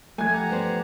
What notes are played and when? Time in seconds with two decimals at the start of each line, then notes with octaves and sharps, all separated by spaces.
0.18 E3 F3 A3 G#5 G#6
0.33 G4 F#5 A#5
0.49 B3 D4 C5